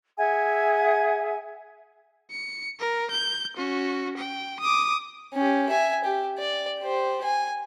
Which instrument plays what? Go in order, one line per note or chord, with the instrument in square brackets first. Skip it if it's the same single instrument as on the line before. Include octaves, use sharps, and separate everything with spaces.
[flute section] G#4 E5 F#5 G#5
[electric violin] C#7
A#4
G6
C#4 F#4
G5
D6 D#6
[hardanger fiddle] C#4 G4
E5 G#5
G4
D5
G4 C5
G#5